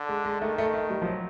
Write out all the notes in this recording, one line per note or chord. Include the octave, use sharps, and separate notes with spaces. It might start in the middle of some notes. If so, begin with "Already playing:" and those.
Already playing: D3
G#3
G#3
D#3 A3
A3
A3
G3
F3
F#3